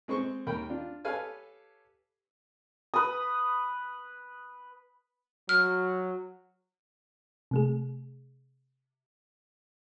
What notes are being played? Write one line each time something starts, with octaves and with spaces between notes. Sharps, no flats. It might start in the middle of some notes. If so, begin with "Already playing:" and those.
G#3 C4 C5 C#6
D#2 A#4 G5 B5
D4 F4
G4 A4 B4 C#5 F5 G#5
B4 D#6
F#3 F6
C3 A3 G#4